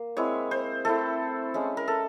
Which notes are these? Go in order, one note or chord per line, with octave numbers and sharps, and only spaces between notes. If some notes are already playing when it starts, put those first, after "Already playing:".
Already playing: A#3
G#3 C4 E4 C#5
C5
A3 C4 E4 A4
G#3 C#4 E4
A#4
A4